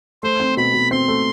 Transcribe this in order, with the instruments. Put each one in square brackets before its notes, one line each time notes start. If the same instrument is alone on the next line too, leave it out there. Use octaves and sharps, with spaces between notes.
[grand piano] A3 [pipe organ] C5
[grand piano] C4
[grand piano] B2 [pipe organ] B5
[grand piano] B2
[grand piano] C4 [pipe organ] C6
[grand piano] A3